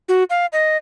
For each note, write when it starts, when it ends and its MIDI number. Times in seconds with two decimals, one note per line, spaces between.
0.09 0.24 66
0.30 0.46 77
0.53 0.77 75